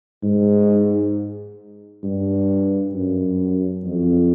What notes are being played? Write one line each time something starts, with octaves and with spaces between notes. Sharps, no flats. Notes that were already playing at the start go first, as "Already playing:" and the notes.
G#2
G2
F#2
F2